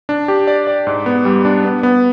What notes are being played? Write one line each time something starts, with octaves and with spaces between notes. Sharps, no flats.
D4
G4
D5
D5
G#2
B3
G3
D4
B3
B3